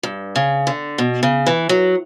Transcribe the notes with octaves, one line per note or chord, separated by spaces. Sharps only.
G2
C#3
D3
B2
C#3
E3
F#3